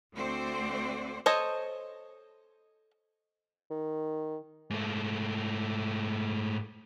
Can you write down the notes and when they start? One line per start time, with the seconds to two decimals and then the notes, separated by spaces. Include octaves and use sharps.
0.14 D2 A3 C4 F#4 C5 D5
1.26 A4 C5 C#5 D#5
3.71 D#3
4.70 G#2 A3